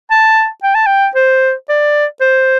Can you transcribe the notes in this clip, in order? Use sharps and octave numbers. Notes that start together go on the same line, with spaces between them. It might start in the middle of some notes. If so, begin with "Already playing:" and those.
A5
G5
A5
G5
C5
D5
C5